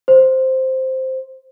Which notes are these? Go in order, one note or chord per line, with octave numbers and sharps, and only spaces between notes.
C5